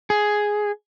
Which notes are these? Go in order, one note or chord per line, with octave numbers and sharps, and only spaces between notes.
G#4